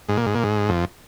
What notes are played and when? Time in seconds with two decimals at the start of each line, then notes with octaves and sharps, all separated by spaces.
0.09 G#2
0.17 A#2
0.26 G#2
0.35 A#2
0.44 G#2
0.69 F2